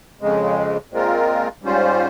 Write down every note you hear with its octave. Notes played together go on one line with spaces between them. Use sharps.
F2 C#3 G#3
A#2 G#3 C4 F4 A#4
G#2 G3 C#4 F4 C5